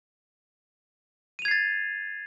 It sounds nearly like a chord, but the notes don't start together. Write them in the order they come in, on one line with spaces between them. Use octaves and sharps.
D#7 F7 G#6 C7 A6